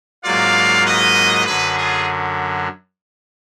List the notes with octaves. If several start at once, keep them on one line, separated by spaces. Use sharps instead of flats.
G#2 F#3 A#3 F4 D5 F5
B4 D#5
F#2 D3 F#3 G#4 B4
F4 G#4